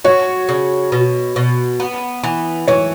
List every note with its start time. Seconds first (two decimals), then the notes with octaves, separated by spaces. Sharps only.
0.05 F#4 C#5
0.49 C#3
0.92 B2
1.36 B2
1.80 B3
2.24 E3
2.68 E3 C#5